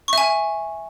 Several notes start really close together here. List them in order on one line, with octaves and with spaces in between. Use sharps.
C#6 E5 G#5